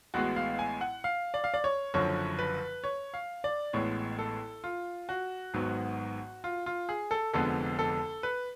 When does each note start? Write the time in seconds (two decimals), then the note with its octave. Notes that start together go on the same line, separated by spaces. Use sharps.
0.14 A1 A2 G#3 B3 F#4
0.36 F5
0.59 G#5
0.81 F#5
1.04 F5
1.34 D5
1.44 F5
1.54 D5
1.64 C#5
1.94 F#1 F#2 D3 F3 C#5
2.39 B4
2.84 C#5
3.14 F5
3.44 D5
3.73 A1 A2 G#3 B3 C#5
4.19 A4
4.64 F4
5.09 F#4
5.54 G#1 G#2 F#3 B3
6.44 F4
6.66 F4
6.89 G#4
7.11 A4
7.33 F1 F2 D3 G#3 B3 A4
7.79 A4
8.23 B4